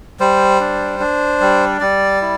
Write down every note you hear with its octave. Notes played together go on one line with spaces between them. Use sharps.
G3 C5
D4
D4
G3
G3 D5
E4